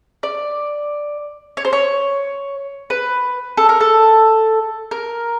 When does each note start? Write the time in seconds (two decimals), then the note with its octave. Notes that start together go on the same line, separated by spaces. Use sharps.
0.23 D5
1.57 C#5
1.65 C5
1.73 C#5
2.90 B4
3.57 A4
3.69 A#4
3.81 A4
4.91 A#4